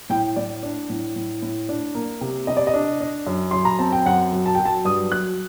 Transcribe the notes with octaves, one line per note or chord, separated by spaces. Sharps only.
A2 G5
A2 D5
D4
A2
A2
A2
D4
A#3
C3
C3 D#5
D5
D#5
D4
D4
F#2
F#2 C6
A#5
C4 A5
G5
F#2 F#5
F#3
A5
F#3 G5
A5
G2 D#6
F#3 F#6